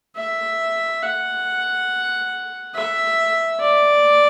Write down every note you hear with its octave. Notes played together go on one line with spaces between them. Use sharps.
E5
F#5
E5
D5